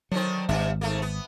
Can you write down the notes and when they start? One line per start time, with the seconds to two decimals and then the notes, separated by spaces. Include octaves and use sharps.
0.12 D3 D#3 F#3 C4
0.49 G#1 G2 D4 E5
0.81 G#2 A3 A#3
1.02 B3